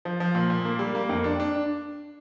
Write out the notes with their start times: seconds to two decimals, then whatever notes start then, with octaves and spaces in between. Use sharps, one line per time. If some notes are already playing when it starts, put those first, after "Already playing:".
0.05 F3
0.20 F3
0.35 A#2
0.50 A#2
0.65 A#3
0.79 G3
0.95 A#3
1.09 F2
1.24 D4
1.40 D4